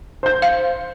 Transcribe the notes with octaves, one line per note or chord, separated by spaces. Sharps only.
C5 G6
F5